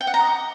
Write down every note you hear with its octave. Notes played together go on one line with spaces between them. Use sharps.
G5
F#5
A#5
D#5
D6